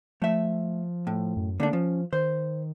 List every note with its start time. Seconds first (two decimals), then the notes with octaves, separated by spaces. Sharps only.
0.22 F3 A3 E5
1.07 A2
1.37 F#2
1.60 D3 A3 A#3 D4
1.73 F3 C#4
2.13 D#3 C5